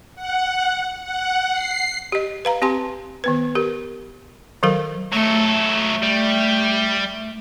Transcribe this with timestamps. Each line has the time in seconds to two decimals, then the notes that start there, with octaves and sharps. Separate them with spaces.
0.15 F#5
1.03 F#5
1.52 C7
2.12 G4 D#5
2.45 B4 F5 A#5
2.62 C4 G4 G#5 C6
3.24 D#3 B3 B4
3.55 G4 A#4
4.63 D#3 F#3 A4 A#4 F5
5.12 F#3 A3 A4
6.03 G3